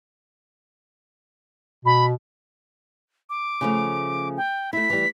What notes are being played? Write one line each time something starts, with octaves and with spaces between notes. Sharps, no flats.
B2 B5
D6
C#3 F3 A3
G5
A3 E4 B6
E3 G3